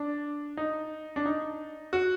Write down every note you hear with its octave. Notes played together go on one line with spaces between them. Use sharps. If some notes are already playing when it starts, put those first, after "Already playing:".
Already playing: D4
D#4
D4
D#4
F#4